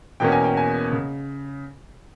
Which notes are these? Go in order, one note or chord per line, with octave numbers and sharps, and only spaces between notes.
E2 B2 A#3 C#4 G5
G#5
G5
G#5
C#3